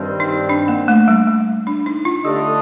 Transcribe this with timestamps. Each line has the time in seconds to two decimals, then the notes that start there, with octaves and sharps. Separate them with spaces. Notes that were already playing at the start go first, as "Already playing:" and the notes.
Already playing: G2 D#3 G3 C4
0.20 D#4
0.49 D4
0.68 A#3
0.88 A3
1.08 G3
1.27 G3
1.67 D4
1.86 D#4
2.05 F4
2.25 D3 A3 D4 G4 A4 D#5